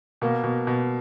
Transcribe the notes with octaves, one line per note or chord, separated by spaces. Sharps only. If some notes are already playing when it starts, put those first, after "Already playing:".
B2 A#3
B2
B2